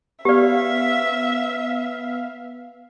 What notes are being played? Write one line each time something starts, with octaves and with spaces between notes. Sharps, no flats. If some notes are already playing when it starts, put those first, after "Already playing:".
B3 G4 D5 E5 F5